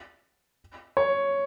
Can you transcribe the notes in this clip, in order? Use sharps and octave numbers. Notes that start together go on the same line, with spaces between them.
C#5